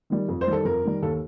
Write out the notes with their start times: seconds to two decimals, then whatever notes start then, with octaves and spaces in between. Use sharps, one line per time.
0.10 D#3 G3
0.29 F2
0.41 C5
0.47 D#3 G3
0.53 A4
0.65 F2 A#4
0.84 D#3 G3
1.02 D#2 A4